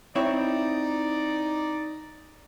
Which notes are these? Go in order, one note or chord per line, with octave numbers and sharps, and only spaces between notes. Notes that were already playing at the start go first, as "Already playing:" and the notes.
C4 D#4 E4 C#5 D5